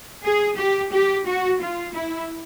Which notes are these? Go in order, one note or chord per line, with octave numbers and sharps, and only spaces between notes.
G#4
G4
G4
F#4
F4
E4